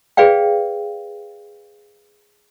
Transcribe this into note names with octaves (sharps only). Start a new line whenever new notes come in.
G#4 B4 D5 F5 G5